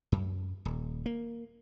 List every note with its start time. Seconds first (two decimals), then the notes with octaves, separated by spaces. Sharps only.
0.12 F#2
0.65 D#1
1.06 A#3